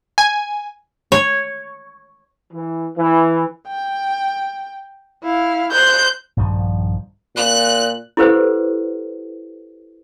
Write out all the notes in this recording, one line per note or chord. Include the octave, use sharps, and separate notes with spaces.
G#5
C#5
E3
E3
G5
E4 F5
C5 F#6 G6
A#1 G2 D#3 F3
A#2 F#6
E4 G4 A4 B4 C5 F#5